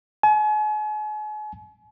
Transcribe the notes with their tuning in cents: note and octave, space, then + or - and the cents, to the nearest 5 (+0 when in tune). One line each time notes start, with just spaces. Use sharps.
G#5 +40